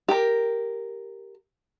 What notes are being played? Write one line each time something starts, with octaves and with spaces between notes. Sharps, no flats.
G4 A#4